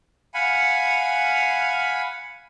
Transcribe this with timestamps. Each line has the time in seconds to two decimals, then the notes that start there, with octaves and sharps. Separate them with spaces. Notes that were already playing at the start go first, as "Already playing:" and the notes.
0.34 F5 F#5 G#5 B5